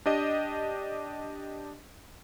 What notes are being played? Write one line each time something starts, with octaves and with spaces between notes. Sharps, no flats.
D4 G4 D#5